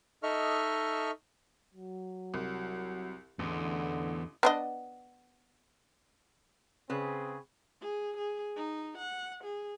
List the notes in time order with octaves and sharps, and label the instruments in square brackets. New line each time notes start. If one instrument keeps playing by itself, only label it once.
[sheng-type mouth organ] D#4 A4 D#5 E5 C#6 F6
[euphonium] F#3
[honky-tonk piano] C2
[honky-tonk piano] A1 [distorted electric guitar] E2 [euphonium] D3
[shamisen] B3 D4 D#5
[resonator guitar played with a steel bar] C#3 B4 [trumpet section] C4 G#4
[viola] G#4
G#4
D#4
F#5
G#4